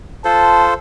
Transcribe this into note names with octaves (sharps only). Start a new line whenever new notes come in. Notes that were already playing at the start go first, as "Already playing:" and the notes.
F4 A4 C5 A5